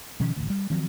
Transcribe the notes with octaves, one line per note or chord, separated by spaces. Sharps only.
B2 D#3 F3 C#4
D1 A1 D2
G3
D#3 F3 F#3 C4